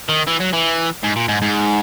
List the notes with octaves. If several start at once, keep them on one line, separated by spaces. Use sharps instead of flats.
D#3
E3
F#3
E3
G#2
A#2
G#2
G#2